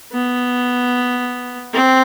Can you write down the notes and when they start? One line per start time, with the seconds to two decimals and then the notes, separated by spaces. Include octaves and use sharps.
0.12 B3
1.73 C4